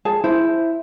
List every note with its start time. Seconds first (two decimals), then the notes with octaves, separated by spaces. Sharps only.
0.05 G#4 A5
0.24 E4 C5